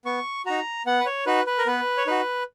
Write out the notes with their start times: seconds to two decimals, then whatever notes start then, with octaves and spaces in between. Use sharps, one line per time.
0.05 B3 C#6
0.46 D#4 F#4 A#5
0.86 B3 F#5
1.00 B4
1.06 C#5
1.26 D#4 F#4 B4
1.47 B4
1.58 A#4
1.66 B3 B4
1.97 C#5
2.07 D#4 F#4 B4